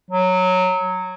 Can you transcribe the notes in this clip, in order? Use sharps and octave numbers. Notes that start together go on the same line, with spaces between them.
F#3